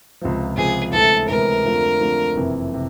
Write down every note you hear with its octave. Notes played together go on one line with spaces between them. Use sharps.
C#2 C3 F3
C#2 C3 F3 G#4
D2 C3 E3 G#3 B3 A4
D2 C3 E3 G#3 B3 A#4
F2 D3 F3 A3 D4
F2 D3 F3 A3 D4
F#1 F2 C3 E3
C3